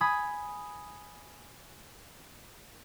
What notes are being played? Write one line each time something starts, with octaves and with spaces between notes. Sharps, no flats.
G#5 B5 D#6